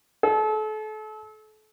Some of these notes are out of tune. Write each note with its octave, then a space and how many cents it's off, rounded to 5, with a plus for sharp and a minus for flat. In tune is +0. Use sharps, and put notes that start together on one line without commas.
A4 -35